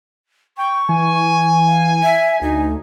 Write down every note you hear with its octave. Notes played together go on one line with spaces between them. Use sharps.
G5 C#6
E3 G#5
F5
E5
D2 D#4